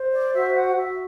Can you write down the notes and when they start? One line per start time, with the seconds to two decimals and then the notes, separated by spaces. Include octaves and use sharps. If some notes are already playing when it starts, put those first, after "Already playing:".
Already playing: C5
0.13 D5
0.33 F#4 E5
0.56 F#5
0.77 F#4 E5